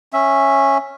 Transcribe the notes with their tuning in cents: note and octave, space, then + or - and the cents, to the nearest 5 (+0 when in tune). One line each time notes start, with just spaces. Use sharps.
C#4 -10 E5 +0